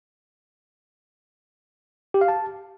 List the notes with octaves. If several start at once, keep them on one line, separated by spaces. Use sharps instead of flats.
G4
F5
A5